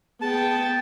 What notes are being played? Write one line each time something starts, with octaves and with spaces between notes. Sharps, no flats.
B3 G#4 G5 A5